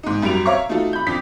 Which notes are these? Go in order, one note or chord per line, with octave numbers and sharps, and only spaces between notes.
G#2 D#4
F#2 G3 F#4 D7 F7
C#5 E5 F5 A#5 C#6
A3 D#4 F4 F#4 A4
B5 G6
F2 D4 B6